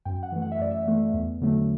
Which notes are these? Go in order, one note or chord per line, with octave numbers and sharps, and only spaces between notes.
F#2 G5
F#5
E3 A3
F#5
E5
F#2 D5
E5
E3 A3
E2
D3 F#3 A3